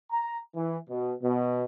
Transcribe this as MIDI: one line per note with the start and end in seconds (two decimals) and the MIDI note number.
0.11 0.38 82
0.55 0.77 52
0.90 1.12 47
1.23 1.64 47